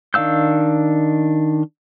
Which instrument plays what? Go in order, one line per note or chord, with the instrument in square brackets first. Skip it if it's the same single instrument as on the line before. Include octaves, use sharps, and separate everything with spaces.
[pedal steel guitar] D#3 D4 F5 E6 G6